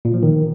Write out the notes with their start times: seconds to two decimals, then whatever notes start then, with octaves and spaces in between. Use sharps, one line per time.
0.05 A#2
0.14 F3
0.23 D#3